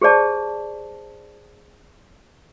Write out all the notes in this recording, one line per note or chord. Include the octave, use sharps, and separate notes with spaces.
G4 G#4 C5 D5 A5